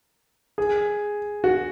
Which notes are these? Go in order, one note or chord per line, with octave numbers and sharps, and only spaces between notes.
G#4
F#4